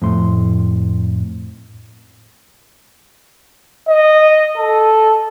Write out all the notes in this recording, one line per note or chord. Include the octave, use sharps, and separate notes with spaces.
F2 A2 C6
D#5
A4